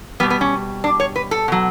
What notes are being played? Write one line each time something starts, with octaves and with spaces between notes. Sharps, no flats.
B2 G3 B3
B3
C#4
D4
C#5
B4
A4
B2 F#3